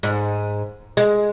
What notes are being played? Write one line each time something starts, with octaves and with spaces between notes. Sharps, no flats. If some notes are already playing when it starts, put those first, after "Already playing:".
G#2
G#3